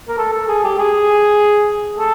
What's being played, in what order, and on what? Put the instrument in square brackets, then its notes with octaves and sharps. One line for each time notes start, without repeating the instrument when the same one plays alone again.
[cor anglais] A#4
A4
A4
G#4
G4
G#4
A4